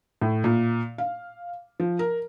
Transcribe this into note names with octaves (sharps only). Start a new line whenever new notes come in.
A2
A#2
F5
F3
A#4